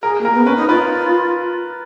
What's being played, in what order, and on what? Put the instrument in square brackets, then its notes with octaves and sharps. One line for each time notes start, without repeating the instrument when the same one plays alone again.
[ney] G#4 [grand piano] A#4
[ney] A#3 [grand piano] A#4
[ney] B3
[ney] C#4 [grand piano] B4
[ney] D#4
[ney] F4 [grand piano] B4